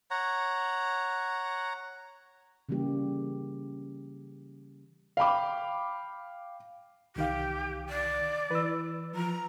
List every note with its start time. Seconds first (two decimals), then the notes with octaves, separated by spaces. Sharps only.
0.11 C#5 F#5 A#5
2.69 C#3 E3 G3 A#3 G4
5.17 F5 G5 B5 D6
7.16 C2 D#3 G4 F5
7.89 D5
8.51 E3 B4 E6
9.15 F3 A#5